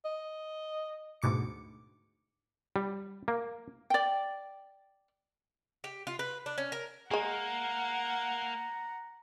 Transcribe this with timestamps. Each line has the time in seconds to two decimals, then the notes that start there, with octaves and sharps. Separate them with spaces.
0.05 D#5
1.22 D2 G#2 B2 D6 C#7
2.76 G3
3.28 A#3
3.90 D5 G5
5.84 G4
6.07 F4
6.19 B4
6.46 D4
6.58 C#4
6.72 A#4
7.11 G#3 A#3 G#4 F#5 A#5